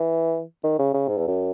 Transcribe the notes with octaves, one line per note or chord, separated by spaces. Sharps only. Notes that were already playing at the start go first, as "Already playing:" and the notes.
Already playing: E3
D#3
C#3
C#3
G#2
E2
F#2